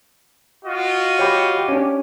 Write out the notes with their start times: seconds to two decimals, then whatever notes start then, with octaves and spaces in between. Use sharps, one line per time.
0.65 F4 F#4 D#5
1.19 G4 C#5 G5 B5
1.68 C#4 D4